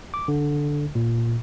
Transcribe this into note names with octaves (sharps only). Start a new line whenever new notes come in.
D6
D3
A#2